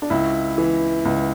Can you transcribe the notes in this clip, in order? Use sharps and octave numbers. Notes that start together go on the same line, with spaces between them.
D4
C#2 E4
E3
C#2